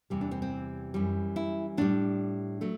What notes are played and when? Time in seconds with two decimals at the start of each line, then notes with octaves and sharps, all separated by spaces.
0.10 E2 C3 E3 G3
0.21 D4
0.31 C4
0.42 C4
0.94 F#2 E3 G3
1.36 E4
1.77 A2 G3 D4
2.61 F#3 A3